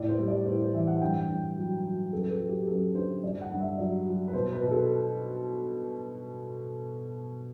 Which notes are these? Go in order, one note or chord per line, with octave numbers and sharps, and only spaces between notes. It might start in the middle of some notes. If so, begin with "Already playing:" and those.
Already playing: A2 D5
C5
G3
D5
A2 C5
C5
E3 E5
F#5
G2 G5
G2
F#3
F#3
F#2 A4
B4
A4
F#3
G4
F#2 A4
D3 C5
G2 D5
F#5
G2
E5
F#3 D5
F#3
B4
B2 C5
B4
B2
A4